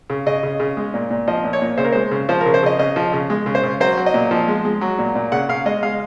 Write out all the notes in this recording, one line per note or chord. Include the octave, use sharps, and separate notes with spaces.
C#3
C#3 D#5
C#3
C#3
G#3
A#2
A#2
F3 D#5
A#2
C#5
A#2
C#3 C5
A#4
G#3 C5
C#3
F3 C5
A#4
C#3
C5
C#3 D#5
C#3 D#5
F3
C#3
G#3
C#3
C5
C#3
F#3 C5
F#3
D#5
A#2
F3
G#3
G#3
F#3
A#2
A#2
C#3 F#5
C#3 F5
G#3 D#5
G#3 F5